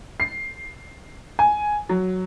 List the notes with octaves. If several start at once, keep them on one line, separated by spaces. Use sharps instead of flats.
C7
G#5
F#3